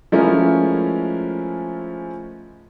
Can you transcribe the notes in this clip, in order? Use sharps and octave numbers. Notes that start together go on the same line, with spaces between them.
F3 G#3 A3 C#4 E4 A#4